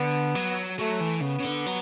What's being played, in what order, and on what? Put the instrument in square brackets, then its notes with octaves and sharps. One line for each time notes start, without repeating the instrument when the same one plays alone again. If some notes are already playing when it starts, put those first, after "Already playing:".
Already playing: [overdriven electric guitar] D3 [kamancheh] B3
[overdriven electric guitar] F#3
[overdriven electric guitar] F#3 [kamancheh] A3
[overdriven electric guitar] E3
[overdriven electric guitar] C#3 [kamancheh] B3
[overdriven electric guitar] C#3
D3
F#3